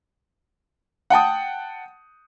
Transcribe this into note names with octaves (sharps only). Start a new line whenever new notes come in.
F#5 G5 A5 D#6